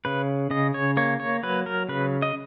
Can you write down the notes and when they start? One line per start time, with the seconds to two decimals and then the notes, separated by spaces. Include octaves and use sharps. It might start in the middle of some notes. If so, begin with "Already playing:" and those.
0.05 C#3 B4
0.51 C#3 D#5
0.74 C#5
0.97 A#3 C#5
1.20 C#5
1.43 F#3 B4
1.66 A#4
1.89 C#3 B4
2.22 D#5